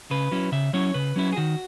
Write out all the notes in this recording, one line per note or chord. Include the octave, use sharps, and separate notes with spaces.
C#3 B4
F#3 C#4 E4
C#3 E5
F#3 C#4 E4 C#5
C#3 B4
F#3 C#4 E4
G#4
D#3 F#4